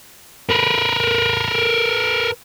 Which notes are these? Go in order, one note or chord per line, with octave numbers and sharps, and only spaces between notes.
A#4 B4